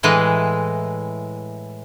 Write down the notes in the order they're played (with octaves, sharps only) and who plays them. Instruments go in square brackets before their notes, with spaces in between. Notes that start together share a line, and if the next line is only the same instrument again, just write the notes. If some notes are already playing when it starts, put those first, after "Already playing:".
[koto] A2 E3 G#3 B4 F#5